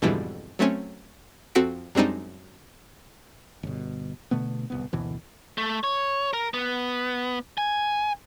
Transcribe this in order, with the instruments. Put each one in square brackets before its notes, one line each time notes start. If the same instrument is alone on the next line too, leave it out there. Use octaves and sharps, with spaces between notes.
[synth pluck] F2 G#2 B2 D3 E3 G3
F#3 A3 C4 C#4
F2 C4 F#4 A4 B6 D7
F#2 G3 G#3 C4 D4 D#4
[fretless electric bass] G1 B2
B2 D3 A3 B3
D1 C2 B3
F#1 D2 B2 E3
[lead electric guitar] A3
C#5
A#4
B3
G#5